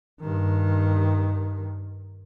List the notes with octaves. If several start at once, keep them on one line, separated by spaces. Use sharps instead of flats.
G2 D#3